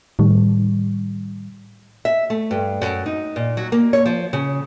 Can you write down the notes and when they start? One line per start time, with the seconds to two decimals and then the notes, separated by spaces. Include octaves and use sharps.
0.19 A2 D#3 G3
2.05 E5
2.30 A3
2.51 G2
2.81 F#2
3.06 D#4
3.36 A#2
3.57 F#3
3.72 A#3
3.93 C#5
4.06 F3
4.33 C#3